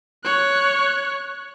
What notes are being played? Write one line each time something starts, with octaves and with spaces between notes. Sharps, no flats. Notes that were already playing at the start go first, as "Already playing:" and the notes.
C#5 F#6